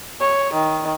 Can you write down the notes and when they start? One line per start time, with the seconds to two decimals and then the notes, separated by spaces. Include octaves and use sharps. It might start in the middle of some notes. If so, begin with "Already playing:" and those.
0.20 C#5
0.53 D#3